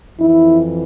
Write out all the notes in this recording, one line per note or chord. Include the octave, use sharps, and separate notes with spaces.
F2 E3 E4